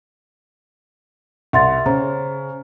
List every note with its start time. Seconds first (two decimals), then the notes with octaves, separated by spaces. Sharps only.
1.53 C2 E5 C6 A6
1.86 C#3 C5 A#5